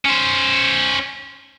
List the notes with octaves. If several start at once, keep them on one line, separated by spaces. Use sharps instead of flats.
C#4 C5